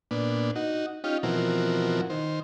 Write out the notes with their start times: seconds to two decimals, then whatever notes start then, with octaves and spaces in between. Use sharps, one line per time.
0.11 A#2 B3 D4
0.56 D#4 F#4
1.04 C#4 D#4 F4 G4
1.23 B2 E3 F3 C4 F#4 A#4
2.10 D#3 C5